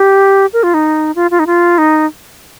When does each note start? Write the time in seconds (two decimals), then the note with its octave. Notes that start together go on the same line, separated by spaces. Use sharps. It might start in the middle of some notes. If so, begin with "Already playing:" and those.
Already playing: G4
0.53 A#4
0.63 F4
0.74 D#4
1.16 F4
1.31 F4
1.39 D#4
1.47 F4
1.78 D#4